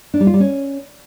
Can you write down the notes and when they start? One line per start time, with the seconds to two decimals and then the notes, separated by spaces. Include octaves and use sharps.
0.14 D4
0.20 G3
0.27 F4
0.34 G3
0.40 C#4